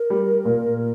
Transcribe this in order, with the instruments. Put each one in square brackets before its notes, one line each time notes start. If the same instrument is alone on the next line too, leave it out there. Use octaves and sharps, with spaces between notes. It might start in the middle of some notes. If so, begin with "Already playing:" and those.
Already playing: [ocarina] A#4
[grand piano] G3
A#2